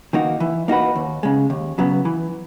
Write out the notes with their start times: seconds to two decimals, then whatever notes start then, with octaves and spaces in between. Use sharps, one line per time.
0.13 D#3 A#3 D#4 F#4
0.40 E3
0.68 A#3 D#4 F#4 B4
0.96 D#2
1.23 C#3 G#3
1.50 D#2
1.78 C#3 F#3 B3
2.05 E3